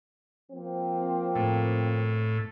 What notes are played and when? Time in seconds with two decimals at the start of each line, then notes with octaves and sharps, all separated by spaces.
0.51 F3 A#3 C4
1.35 A2